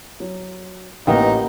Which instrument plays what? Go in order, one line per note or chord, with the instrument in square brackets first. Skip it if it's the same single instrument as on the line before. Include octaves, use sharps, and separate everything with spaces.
[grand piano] F#3
[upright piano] A1 [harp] A#3 B3 A#4 [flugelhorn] D#4 [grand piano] G5